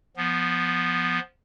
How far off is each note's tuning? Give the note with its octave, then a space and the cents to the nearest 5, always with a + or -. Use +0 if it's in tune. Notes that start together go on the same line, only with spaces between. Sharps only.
F3 +0 B3 +0